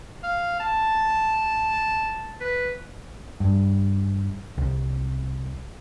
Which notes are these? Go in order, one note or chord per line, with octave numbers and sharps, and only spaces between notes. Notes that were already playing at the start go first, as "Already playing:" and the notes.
F5
A5
B4
G2
C2